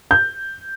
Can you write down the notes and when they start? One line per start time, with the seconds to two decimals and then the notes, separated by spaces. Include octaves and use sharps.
0.11 G6